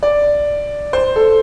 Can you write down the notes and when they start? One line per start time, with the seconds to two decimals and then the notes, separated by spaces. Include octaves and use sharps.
0.03 D5
0.93 C5
1.16 A4